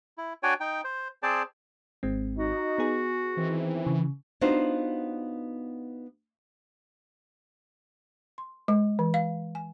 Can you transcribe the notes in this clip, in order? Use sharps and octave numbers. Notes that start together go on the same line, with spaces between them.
E4
D4 F#4 C#5 D5 G5 G#5
D#4 G5
C5
C4 G#4 C5 D5 A5
G#1 G#3 C4
D#4 F#4
B3 G#4
D#3 E3 C4
C#3
B3 D4 D#4 F4 F#4 C5
C6
G#3
E3
F5
G#5